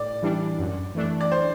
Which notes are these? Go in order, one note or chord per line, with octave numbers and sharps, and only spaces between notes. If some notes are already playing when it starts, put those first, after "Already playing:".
Already playing: A2 D5
E3 G3 D4
F#2
E3 A3 D4
D5
C5